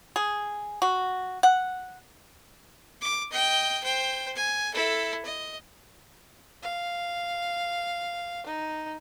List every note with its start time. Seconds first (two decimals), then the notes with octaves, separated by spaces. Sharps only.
0.16 G#4
0.82 F#4
1.43 F#5
3.02 D6
3.31 D#5 G5
3.83 C5 G5
4.36 G#5
4.74 E4 A4
5.25 D#5
6.63 F5
8.46 D#4